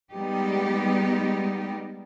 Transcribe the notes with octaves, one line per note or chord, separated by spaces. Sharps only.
G3 G#3 B3 D#4 G4